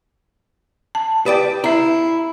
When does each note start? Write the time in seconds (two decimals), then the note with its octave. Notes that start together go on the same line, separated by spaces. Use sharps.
0.95 A5
1.26 G4 B4 D5 G5
1.64 E4 E5 A#5